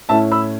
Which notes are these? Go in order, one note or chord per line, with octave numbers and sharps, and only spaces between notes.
A2 A3 C#4 E4 E5 A5
B5 E6